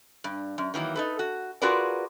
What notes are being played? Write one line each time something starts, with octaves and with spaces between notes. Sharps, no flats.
G2
F#2
D#3 E3 F#3 A#3
D#4 A4 B4
F#4
F4 F#4 G#4 A#4 B4 D5